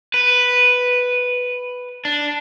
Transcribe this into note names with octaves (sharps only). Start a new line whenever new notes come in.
B4
D4